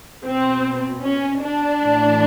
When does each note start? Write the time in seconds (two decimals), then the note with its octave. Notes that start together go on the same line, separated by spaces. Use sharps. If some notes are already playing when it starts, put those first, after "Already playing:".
0.24 B2 C4
1.02 C#4
1.41 D4
1.80 A2 E3